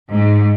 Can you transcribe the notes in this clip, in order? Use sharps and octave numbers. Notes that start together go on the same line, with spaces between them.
G#2